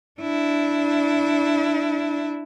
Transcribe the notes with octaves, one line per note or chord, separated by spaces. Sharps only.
D4 E4